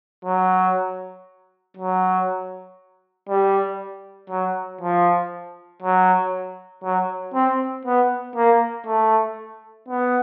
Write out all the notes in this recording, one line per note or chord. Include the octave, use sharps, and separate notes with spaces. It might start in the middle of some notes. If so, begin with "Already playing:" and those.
F#3
F#3
G3
F#3
F3
F#3
F#3
C4
B3
A#3
A3
B3